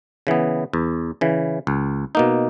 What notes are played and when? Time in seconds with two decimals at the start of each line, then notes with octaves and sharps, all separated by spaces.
0.27 C#3 E3 B3
0.73 E2
1.21 C#3 E3
1.67 C#2
2.15 B2 A#3 D#4